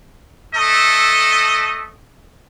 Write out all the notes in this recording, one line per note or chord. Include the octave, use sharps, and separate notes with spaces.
A3 A4 D#5